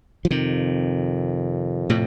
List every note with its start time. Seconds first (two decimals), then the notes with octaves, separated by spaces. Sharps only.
0.25 F3
0.31 F2 C3 D#3
1.90 A2 C3